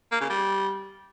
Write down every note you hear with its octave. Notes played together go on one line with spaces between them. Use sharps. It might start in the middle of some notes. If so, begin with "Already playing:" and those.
A#3
C#3
G3